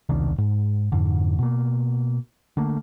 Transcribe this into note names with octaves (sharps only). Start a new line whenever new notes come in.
E1 C2 D#3 D4
G#2
F2 G#2 D3
B2 A#3
D3 A3 A#3